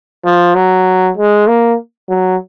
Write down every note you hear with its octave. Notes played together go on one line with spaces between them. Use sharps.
F3
F#3
G#3
A#3
F#3